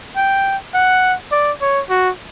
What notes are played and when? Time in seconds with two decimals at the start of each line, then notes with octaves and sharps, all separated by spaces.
0.16 G5
0.74 F#5
1.31 D5
1.61 C#5
1.90 F#4